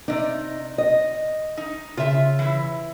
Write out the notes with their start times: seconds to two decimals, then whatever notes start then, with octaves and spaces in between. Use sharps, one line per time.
0.08 C3 D#4 D5
0.78 D#5
1.57 D#4
1.97 C#3 F4 E5
2.39 E3 E4